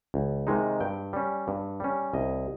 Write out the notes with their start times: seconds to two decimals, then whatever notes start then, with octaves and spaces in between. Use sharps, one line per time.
0.14 C#2
0.47 C3 D#3 G#3 D#4
0.80 G2 G5
1.13 G3 C#4
1.48 G2
1.80 G3 C#4
2.13 C2 D#5